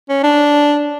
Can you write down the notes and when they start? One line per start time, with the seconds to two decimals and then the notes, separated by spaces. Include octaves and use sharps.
0.09 C#4
0.23 D4